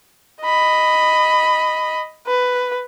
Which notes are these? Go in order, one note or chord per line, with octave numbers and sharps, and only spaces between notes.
D#5 B5
B4